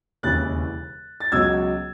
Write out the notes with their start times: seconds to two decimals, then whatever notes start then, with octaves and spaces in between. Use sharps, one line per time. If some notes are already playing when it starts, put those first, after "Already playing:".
0.23 E1 D#2 C#3 E3 F#6 A6
1.20 A6
1.32 C#2 B2 F#3 E6 G#6